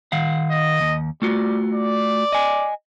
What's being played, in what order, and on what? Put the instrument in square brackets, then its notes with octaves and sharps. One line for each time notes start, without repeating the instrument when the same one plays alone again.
[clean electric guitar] D#3 F5 F#5
[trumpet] D#5
[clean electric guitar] D#2
[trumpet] G3 [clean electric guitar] A3 F4 F#4
[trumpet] D5
[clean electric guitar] D#5 G#5